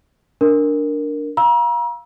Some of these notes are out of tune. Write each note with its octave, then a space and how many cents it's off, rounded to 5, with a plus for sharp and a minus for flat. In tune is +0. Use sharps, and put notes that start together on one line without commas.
D4 +0 A#4 -5
F5 +0 A#5 +40 E6 +0